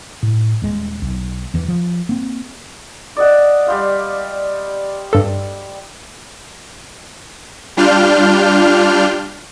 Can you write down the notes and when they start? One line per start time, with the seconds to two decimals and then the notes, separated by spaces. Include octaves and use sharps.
0.23 A2
0.62 D#1 G#3
1.02 B1
1.54 E2 E3
1.68 F3
2.09 A#3 C4
3.17 D5 D#5 F#5
3.66 G3 C5 F5
5.13 G2 A4
7.77 G3 D4 F4 F6 G6